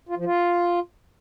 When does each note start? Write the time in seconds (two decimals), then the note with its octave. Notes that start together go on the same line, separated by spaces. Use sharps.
0.09 F4
0.17 F3
0.25 F4